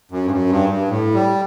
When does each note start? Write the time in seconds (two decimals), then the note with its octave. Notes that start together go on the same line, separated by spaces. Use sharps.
0.11 F#2
0.26 G2
0.31 F#2
0.50 G2
0.69 G2
0.88 A2
1.14 G3